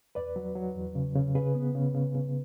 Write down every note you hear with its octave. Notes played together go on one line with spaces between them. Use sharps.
E2 B4 D5
F#3
F#3
E2
C#3
C#3
C#3 G#4 B4
B3
C#3
C#3
C#3